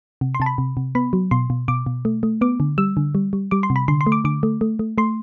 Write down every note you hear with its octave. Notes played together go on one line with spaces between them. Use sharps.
C3
C6
C3 A5
B5
C3
C3
B3 B5
F#3
B2 C6
B2
B2 D6
B2
A3
A3
B3 D6
D3
G3 E6
D3
G3
G3
G3 D6
C6
C3
B5
D3 C6
C6
A3
D6
D3 D6
A3
A3
A3
A3 C6